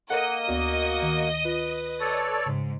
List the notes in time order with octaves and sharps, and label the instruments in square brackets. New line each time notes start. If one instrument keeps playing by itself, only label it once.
[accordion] A#3 [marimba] A4 A#4 [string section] D#5 D#6 [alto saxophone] F#5
[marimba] D2 B3 D5 [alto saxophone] F#4
[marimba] D#3
[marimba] F4 [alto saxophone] B4
[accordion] A4 C#5 D5
[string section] G#2 [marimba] C#3